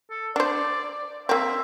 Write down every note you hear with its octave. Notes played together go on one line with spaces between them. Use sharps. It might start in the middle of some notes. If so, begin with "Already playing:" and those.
A4
D4 C5 D5
A#3 C4 E5